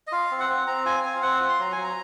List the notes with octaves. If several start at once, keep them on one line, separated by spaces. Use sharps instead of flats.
D#5
F4 F5
C4
F#5
C4
C4 A#5
F4 G#5
C4 G#5
F5
C4 F#5
F4
C6
F#3 A#5
G#5
F#3
A#5